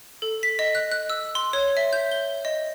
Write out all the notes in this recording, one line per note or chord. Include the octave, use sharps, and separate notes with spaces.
A4
B6
D#5
F#6
F#6
E6
C6
C#5
E5
G6
G7
D#5